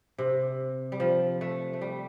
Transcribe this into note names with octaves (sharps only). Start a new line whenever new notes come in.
C3
G3
F3
A3
A3
G3